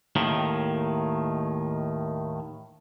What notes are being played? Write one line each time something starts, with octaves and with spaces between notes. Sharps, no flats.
D#2 A2 D#3